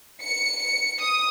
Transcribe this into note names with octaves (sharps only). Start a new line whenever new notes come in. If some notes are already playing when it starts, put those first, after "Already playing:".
C#7
C#7
D#6